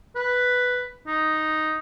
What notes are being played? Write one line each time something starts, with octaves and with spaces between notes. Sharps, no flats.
B4
D#4